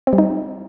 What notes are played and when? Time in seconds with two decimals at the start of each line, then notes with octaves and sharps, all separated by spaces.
0.07 C4
0.13 G3
0.18 D#4